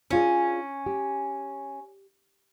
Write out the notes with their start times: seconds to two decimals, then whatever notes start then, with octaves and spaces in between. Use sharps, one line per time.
0.11 C#4 D4 F4 G#4
0.86 G4